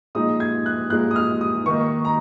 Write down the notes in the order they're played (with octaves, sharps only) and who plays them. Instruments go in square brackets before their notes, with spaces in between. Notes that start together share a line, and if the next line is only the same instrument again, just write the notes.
[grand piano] A#2 F3 G#3 D#4 D#6
G#6
F#6
A#2 F3 G#3 D#4 F#6
D#6
F6
D#6
D#3 A#3 D#4 C#6
A#5